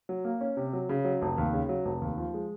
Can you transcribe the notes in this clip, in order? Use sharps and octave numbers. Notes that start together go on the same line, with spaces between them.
F#3
A#3
C#4
C3
F#3
C#3
F#3
F1
D#2
C#3
F#3
F1
D#2
F3
G#3